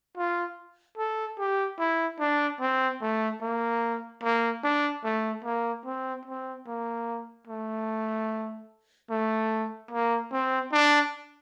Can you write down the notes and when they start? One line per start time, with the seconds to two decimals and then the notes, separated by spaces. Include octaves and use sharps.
0.17 F4
0.98 A4
1.39 G4
1.79 E4
2.20 D4
2.60 C4
3.01 A3
3.41 A#3
4.23 A#3
4.64 D4
5.04 A3
5.44 A#3
5.85 C4
6.26 C4
6.67 A#3
7.47 A3
9.10 A3
9.91 A#3
10.32 C4
10.72 D4